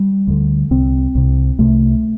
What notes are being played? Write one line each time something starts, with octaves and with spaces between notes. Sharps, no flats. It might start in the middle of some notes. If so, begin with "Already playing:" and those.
Already playing: G3
D2 D3
C2 C3 C4
C2 C3
C2 C3 A3